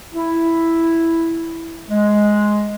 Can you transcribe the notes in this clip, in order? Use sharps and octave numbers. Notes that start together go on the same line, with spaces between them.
E4
G#3